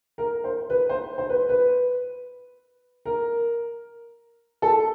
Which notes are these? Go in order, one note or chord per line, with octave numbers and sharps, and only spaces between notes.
A#4
C5
B4
C5
C5
B4
B4
A#4
A4